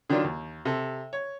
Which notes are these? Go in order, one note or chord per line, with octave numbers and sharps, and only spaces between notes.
D3 D#3 F#3 D4 F4
D#2
C3 A4
C#5